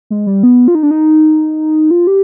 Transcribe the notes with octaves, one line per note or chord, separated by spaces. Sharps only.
G#3
G3
B3
F4
D#4
D4
D#4
F4
G4